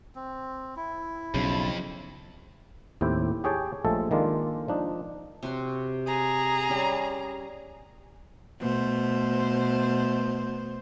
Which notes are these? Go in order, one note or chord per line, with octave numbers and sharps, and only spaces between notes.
C4
E4
B1 F2 C#3
D#2 A2 C4 E4 G4 G5
G4 G#4 C#5 G5 A5
A#1 F3 G#3 A3 A4
D#3 G#3 A#3 D4 F4
F3 D4 D#4
C3 F#4 C6
G#4 A#5
G3 C#4
B2 A3 C5